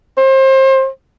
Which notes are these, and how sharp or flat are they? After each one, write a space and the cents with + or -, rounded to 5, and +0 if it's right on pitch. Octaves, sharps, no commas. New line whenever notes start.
C5 +30